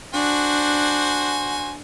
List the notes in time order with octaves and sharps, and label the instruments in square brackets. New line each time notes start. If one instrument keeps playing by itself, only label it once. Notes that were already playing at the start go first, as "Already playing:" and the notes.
[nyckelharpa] D4 [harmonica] F#4 C5 G#5